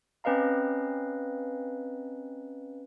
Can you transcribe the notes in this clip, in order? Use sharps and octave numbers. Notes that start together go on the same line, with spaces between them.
C4 C#4 B4 D#5 F5 A#5